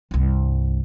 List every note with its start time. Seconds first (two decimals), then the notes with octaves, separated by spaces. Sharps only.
0.11 C2 G2